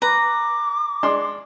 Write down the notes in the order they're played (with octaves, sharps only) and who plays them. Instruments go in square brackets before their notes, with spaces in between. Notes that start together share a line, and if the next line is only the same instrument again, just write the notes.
[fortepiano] B4 [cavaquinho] A#5 [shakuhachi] D6
[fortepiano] G#3 D4 C6